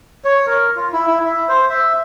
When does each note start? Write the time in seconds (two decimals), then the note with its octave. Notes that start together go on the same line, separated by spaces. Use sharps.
0.25 C#5
0.47 A#4
0.76 F4
0.92 E4
1.07 E4
1.25 E5
1.48 C5
1.70 E5